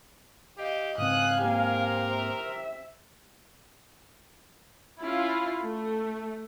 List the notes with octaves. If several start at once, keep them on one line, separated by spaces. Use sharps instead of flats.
G4 D#5 F5
G#2 C#3 C4 F5 G#5 D#6 F#6
G#2 A#3 C4 G4 A#4 C5
E5
C#4 E4 F4
A3